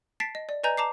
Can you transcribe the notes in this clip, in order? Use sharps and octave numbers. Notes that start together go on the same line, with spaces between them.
A5 A6 B6 C7 D7
D#5
D5
B4 D5 D#5 G#5 A#5 G6
A5 A#5 D6 C7